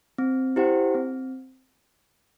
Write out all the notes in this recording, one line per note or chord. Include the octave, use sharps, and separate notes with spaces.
C4
E4 G4 C5 F#5
C4